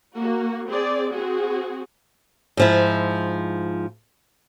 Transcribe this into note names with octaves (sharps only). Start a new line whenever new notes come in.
A#3 F#4
C4 G#4 D5
C4 F#4 G#4
G#2 F3 E4